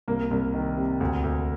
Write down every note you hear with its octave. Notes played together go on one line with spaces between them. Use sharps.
C2 A#3
C2
D#3
C3
D2
D2